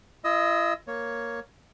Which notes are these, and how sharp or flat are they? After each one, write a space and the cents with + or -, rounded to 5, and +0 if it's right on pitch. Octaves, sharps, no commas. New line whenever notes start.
E4 +45 D#5 +0 E6 -25
A#3 +0 C#5 +0